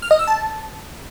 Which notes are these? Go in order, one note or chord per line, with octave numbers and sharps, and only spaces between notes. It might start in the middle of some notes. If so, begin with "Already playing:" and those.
F6
D#5
E6
A5